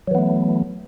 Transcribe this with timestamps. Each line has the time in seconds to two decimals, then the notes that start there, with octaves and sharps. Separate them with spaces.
0.07 F#3
0.11 E3
0.15 B3
0.18 A3